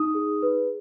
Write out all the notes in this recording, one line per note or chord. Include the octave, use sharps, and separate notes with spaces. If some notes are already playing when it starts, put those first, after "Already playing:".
Already playing: D#4 D#6
G#4
B4